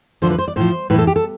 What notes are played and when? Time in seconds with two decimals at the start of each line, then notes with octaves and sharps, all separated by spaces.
0.22 D2 D3 F3 C5
0.30 B4
0.39 C5
0.48 D5
0.56 A2 F3 C5
0.90 A2 B4
0.94 E3 A4
1.07 G4
1.16 A4